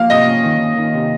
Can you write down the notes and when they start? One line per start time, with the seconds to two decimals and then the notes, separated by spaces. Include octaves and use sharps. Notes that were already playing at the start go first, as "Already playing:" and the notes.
Already playing: F3 A#3 F5
0.10 C3 D#5
0.27 C#4
0.43 D#3
0.60 D#3
0.77 D#3
0.94 C3